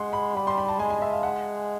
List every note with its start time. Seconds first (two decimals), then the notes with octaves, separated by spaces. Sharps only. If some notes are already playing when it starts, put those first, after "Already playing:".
Already playing: G#3 F#5 C6
0.13 B5
0.36 G3 B5
0.47 C6
0.58 B5
0.68 A5
0.79 G#3 G#5
0.90 G#5
0.97 D#5
1.02 E5
1.13 F5
1.23 F#5